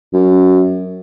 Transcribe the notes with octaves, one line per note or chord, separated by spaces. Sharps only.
F#2